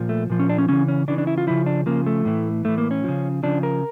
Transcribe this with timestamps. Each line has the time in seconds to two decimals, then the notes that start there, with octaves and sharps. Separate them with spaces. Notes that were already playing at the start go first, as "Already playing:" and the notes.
Already playing: A#2 F3
0.09 A3
0.30 A#2 F3
0.39 C#4
0.49 D4
0.58 C#4
0.69 C#3 E3 C#4
0.88 C#4
1.08 C#3 E3 D4
1.18 D4
1.27 E4
1.38 F4
1.47 C#3 F3 E4
1.66 D4
1.86 C#3 F3 A#3
2.06 A3
2.25 A2 E3
2.65 A2 E3 A3
2.78 A#3
2.91 C#4
3.04 C#3 F3
3.43 C#3 F3 D4
3.63 A#4